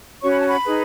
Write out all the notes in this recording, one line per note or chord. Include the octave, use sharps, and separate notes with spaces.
C#4 F#4 C#5 C#6
B5
A5
B5
D#4 G#4 B4